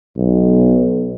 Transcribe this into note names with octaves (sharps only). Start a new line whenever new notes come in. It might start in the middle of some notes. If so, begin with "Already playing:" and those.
B1